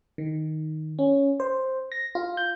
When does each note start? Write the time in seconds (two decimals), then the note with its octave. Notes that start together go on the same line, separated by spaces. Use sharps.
0.18 D#3
0.99 C#4
1.40 C5
1.92 A#6
2.15 F4
2.37 G6